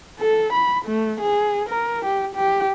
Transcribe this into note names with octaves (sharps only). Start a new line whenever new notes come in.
A4
B5
A3
G#4
A#4
G4
G4